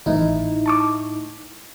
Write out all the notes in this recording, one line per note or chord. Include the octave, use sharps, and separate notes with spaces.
G#1 A2 E3 D#4 E4
A5 C#6 D6